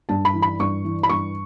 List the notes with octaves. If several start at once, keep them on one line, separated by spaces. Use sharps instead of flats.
G2 A5
B5
E3
B5
G2 C#6
E3
B5
G2 C#6